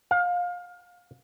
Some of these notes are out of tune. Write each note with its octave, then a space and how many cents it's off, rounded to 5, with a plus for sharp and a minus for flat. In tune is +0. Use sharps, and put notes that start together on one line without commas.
F5 +25